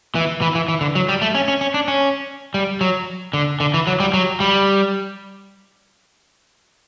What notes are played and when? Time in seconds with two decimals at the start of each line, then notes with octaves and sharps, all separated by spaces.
0.15 E3
0.42 E3
0.55 E3
0.68 E3
0.81 D3
0.95 F#3
1.09 G3
1.22 A3
1.35 C#4
1.48 C#4
1.61 C#4
1.74 D4
1.88 C#4
2.54 G3
2.81 F#3
3.33 D3
3.60 D3
3.74 E3
3.87 F#3
4.00 G3
4.13 F#3
4.40 G3